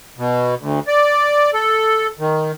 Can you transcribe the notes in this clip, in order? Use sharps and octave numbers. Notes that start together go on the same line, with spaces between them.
B2
D2
D5
A4
D#3